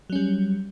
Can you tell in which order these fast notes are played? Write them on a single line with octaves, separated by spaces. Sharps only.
F#3 C#4 G3